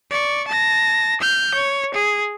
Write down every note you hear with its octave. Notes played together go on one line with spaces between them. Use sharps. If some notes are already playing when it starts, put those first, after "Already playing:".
D5 C#6
A5 A#6
F6 G6
C#5
G#4